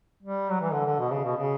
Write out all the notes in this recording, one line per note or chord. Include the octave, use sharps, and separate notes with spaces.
G3
F#3
E3
D3
D3
B2
C#3
B2
C#3